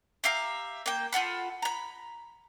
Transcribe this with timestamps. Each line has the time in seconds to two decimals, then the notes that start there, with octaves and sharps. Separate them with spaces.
0.24 G4 E5 F5 A#5
0.86 A#3 G5
1.12 F4 A4 F#5 B5
1.62 A#5 B5